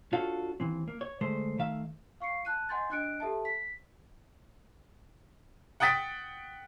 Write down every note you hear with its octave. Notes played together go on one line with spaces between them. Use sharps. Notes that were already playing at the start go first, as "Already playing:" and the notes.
D4 F4 F#4 A4 C#5 F5
D#2 E3 C4
A#3
C#5
D3 G#3 A3 C5
D#3 A3 E5 F5
F5 C#6 C7 C#7
A5 F#6 D#7
D#5 F#5 G#5 C6 G6 A6
D4 D#5 F#6 C#7 D7
G4 A4 E5 A5
B6
F#5 G5 D#6 A6 B6 D7